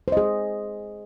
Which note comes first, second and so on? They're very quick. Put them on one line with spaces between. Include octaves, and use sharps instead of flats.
C5 D#5 G#4